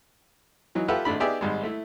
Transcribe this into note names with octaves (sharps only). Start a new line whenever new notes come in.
E3 F#3 D#4
F4 G4 A4 B4 E5 F#5
G#1 A3 D4 B5
B3 D#4 G4 G#4 D5 E5
G#1 G3 G#3
A3 E4